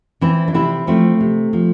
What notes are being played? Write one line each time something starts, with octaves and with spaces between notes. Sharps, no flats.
E3 C4 E4
D4
C3 C4 E4
F3 A3 C4
C3
F3